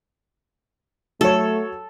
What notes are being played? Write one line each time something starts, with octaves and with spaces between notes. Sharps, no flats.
F#3 A3 A4 C#5